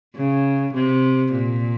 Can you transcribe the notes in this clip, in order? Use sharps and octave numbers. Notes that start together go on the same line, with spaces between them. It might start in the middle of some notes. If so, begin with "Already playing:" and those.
C#3
C3
A#2